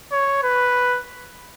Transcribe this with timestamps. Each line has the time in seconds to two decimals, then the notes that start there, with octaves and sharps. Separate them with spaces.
0.12 C#5
0.44 B4